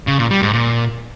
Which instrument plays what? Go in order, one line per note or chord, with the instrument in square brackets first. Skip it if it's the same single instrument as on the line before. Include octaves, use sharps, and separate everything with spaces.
[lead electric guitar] C#3
A#2
G3
G#2
A#2